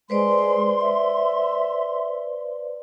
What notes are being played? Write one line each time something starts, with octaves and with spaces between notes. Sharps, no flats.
G#3 B4 C5 D5 C6
E5